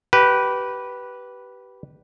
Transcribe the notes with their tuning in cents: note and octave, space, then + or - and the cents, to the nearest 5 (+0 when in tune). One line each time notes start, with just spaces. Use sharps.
G4 -25 B4 -5